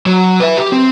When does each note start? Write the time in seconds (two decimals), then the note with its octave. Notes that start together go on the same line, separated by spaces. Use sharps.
0.06 F#3
0.40 B4 E5
0.57 G4
0.72 C4